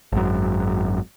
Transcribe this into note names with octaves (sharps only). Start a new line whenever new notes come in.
G#1 F#2